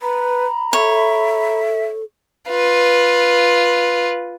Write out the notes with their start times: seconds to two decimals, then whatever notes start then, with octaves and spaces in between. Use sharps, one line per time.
0.01 B4 A#5 B5
0.73 A4 C#5 E5
2.49 F4 B4